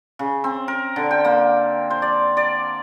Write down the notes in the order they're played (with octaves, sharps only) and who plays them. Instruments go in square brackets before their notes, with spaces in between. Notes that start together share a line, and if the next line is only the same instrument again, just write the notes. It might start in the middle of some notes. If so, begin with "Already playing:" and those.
[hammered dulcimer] C#3
C4
A#4
D3
G5
A#3
C5
D5
D5